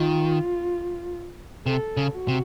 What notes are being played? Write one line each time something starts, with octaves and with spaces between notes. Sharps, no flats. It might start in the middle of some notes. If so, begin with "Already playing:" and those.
Already playing: D#3 F4
C3 A4
C#3
F#4
C3